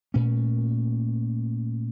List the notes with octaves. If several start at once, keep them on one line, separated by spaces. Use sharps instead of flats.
A#2 A3 C#4